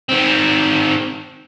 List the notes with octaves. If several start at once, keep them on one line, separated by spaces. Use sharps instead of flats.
D#3 C4